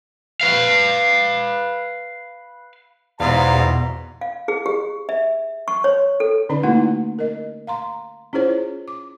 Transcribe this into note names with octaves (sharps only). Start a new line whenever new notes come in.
B4 F5
E2 G#2 B2 G3 B3 C5 F5 A#5
F5
G#4
G4
E5
C#6
C#5
A4
D3 C#4 D#4 D5 B5
A3 A#3 D#4 E4 F#4 F#5
A#4 D#5
F5 A#5 C6
C#4 E4 F4 G#4 C5 C#5
D6